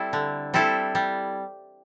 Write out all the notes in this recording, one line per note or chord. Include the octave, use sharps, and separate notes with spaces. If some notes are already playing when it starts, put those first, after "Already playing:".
Already playing: G3 C4 E4 A4
D3
G3 C4 E4 A4
G3